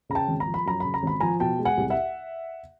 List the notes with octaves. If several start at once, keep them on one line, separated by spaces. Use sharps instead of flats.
C#3 A#5
G5 A5
G#1
A#5
F3
B5
F#2 A#5
C#3 B5
A#5
G#1 B5
F3 G#5 A#5
B2 G5 A5
G#3
F#5 G#5
C2
E5 F#5